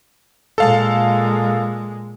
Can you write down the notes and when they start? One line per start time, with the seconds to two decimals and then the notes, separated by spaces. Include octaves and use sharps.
0.58 A#2 G#3 A4 F5 A5